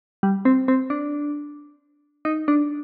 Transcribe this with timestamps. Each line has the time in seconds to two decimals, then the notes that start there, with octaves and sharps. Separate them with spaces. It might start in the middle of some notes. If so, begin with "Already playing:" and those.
0.23 G3
0.45 C4
0.68 C4
0.90 D4
2.25 D#4
2.48 D4